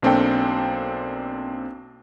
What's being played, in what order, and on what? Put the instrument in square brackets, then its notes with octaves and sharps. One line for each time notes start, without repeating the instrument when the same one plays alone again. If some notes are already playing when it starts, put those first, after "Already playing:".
[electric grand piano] B1 A#3 C4 D4 A4 G5